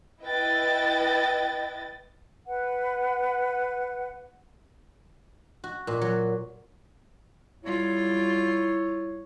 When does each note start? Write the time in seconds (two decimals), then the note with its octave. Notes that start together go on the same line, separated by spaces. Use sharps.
0.22 E4 B4 D#5 G5 A6
2.46 B4 F#5
5.64 F#4
5.87 A#2
6.01 F#3
7.64 G3 E4 F4 C#5